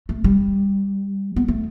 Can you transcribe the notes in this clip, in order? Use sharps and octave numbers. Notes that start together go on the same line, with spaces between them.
A3
G3
B3
A3